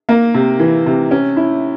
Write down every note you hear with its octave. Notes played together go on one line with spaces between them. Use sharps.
A#3
C3
E3
C3
C#4
E4